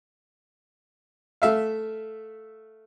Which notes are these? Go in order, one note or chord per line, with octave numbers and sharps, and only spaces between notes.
A3 E5 F5